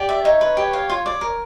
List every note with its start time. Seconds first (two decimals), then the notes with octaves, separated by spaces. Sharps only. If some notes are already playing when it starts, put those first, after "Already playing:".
Already playing: G4 D5
0.09 E5
0.25 D#4 C#5
0.41 B4
0.57 G4
0.73 F5
0.90 F4
1.06 D5
1.21 A#4